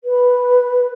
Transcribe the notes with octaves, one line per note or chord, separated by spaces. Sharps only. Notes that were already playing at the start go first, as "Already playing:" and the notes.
B4